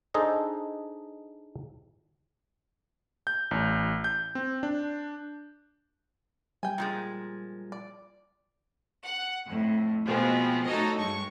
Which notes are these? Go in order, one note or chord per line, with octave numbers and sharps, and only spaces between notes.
D4 D#4 G#4 A4 C5 D#5
G6
A1
G6
C4
D4
G3 G5 G#5
A#2 F3 G#3
D5
F#5
F2 A2
B2 F3 G#3 B3 C4
A3 D#4 F#4 A4 C#5 D#5
G2 G#3 C#6